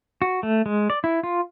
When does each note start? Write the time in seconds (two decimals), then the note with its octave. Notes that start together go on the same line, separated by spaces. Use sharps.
0.22 F#4
0.43 A3
0.66 G#3
0.90 D5
1.04 E4
1.23 F4